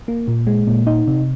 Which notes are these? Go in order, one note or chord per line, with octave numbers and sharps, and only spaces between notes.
A#3
A#2
G#3
A#2
D#4
C3